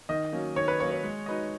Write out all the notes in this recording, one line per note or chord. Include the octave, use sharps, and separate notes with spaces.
D#3 D#5
F#3 A#3 C#4
D#3 C#5
B4
F#3 A#3 C#4 C#5
C#5
G#3
D#4 F#4 B4 D#5